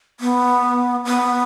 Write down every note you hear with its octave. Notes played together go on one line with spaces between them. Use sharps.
B3
B3